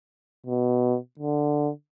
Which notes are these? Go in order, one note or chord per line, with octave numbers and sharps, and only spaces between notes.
B2
D3